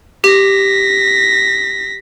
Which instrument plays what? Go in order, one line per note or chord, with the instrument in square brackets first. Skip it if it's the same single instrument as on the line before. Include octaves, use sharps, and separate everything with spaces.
[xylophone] G4 [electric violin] A#6 B6